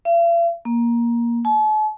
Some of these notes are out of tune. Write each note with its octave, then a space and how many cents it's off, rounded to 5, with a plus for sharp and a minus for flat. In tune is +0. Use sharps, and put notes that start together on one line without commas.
F5 -45
A#3 +15
A5 -45